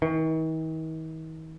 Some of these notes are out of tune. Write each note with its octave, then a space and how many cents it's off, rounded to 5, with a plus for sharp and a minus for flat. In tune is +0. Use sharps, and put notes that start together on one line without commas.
D#3 +45